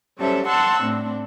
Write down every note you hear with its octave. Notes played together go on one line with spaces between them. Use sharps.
F#3 G3 C#4 A4 C5 E5
F#5 A5 C6 C#6 E6 F#6
A2 C4 D4